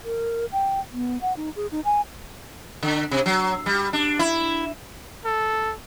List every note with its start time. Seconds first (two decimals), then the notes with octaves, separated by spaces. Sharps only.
0.05 A#4
0.52 G5
0.93 B3
1.22 F#5
1.37 D#4
1.56 G#4
1.72 D#4
1.85 G#5
2.83 D3
3.11 C3
3.26 F#3
3.66 G3
3.93 D4
4.19 E4
5.25 A4